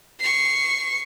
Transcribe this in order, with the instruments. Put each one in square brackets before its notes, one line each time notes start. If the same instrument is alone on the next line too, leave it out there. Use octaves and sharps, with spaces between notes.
[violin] C#6 C7